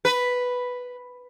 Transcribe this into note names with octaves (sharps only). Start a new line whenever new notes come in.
B4